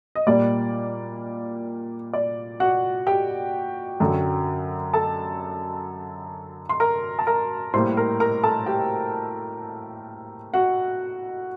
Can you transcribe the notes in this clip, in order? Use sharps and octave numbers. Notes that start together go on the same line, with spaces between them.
D#5
A#2 G3 A#3 D5
D5
F#4 F#5
G4 G5
F#2 D3 F#3
A4 A5
C6
A#4 A#5
A5
A#4 A#5
A2 G3 A#3 C5 C6
A#4 A#5
A#4 A#5
A4 A5
G4 G5
F#4 F#5